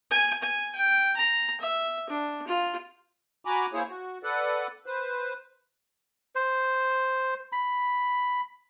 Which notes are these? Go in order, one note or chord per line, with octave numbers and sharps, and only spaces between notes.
G#5
G#5
G5
A#5
E5
D4
F4
F#4 G#5 A#5 B5 D6
A#3 E4 G#4 C5 C#5
F#4
A4 B4 D5 F#5
B4 C5
C5
B5